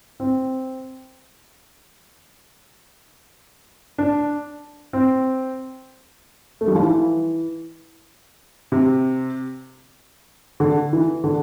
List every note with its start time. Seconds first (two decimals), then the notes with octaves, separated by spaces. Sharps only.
0.20 C4
3.98 D4
4.93 C4
6.61 A3
6.68 G3
6.75 F3
6.82 E3
8.72 C3
10.60 D3
10.93 E3
11.24 D3